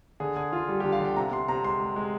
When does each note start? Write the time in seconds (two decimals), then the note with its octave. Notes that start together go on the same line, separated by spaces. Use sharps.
0.20 D3 G#4
0.36 D3 G#4
0.53 D3 F4
0.68 G3
0.80 D3 G4
0.92 F5
1.00 D3 G5
1.17 C3 A#5
1.32 C3 C6
1.48 C3 A#5
1.64 G#3 C6
1.80 G#3
1.96 G#3